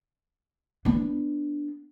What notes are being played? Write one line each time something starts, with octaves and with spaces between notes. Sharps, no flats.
B3 D4